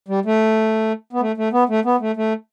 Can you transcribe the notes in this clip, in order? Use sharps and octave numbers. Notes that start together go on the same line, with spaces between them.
G3
A3
B3
A3
A3
B3
A3
B3
A3
A3